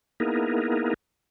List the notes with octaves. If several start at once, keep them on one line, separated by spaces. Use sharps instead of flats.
A#3 B3 D#4 E4 G#4 A#4